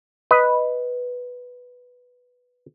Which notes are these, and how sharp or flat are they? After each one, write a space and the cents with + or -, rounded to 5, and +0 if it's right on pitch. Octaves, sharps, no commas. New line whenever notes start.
B4 +0 D#5 +0